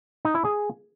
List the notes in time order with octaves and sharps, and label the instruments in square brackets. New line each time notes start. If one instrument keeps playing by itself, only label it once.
[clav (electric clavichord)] D#4
E4
G#4